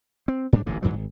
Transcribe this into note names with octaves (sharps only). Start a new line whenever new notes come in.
C4
G#2 G3 D4
D1 A1 G#2 C3
F2 G#2 E3 F#3
G#1